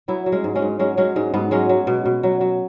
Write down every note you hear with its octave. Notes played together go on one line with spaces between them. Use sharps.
F#3 B3 E4
F#3
G#3 C#4
G#2
G#3 C#4
G#2
F#3 G#3 C#4
F#3 G#3 C#4
G#2 G#3
G#2 B3
F#3 G#3 C#4
F#3
B2
B2
F#3
F#3